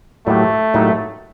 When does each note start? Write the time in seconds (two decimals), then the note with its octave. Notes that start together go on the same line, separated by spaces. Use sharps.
0.26 A2 F#3 A3 A#3 D#4 G4
0.74 A2 F#3 A#3 D#4 G4